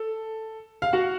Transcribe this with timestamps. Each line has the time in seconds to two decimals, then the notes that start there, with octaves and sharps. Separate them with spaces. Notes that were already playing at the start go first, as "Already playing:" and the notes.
Already playing: A4
0.82 F5
0.93 F#4 F#5